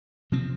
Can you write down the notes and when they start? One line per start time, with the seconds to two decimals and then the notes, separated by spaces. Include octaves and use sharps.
0.32 C3 F3 C4